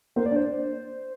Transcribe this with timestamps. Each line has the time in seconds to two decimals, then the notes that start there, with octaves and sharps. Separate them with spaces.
0.16 A#3 C5
0.26 D5
0.31 D4
0.36 C5